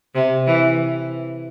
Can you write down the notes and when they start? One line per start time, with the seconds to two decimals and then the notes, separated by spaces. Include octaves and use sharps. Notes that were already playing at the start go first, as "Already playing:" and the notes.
0.15 C3
0.47 E3